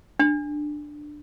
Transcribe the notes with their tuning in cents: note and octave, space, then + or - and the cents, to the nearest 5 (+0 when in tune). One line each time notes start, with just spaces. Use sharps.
D4 +10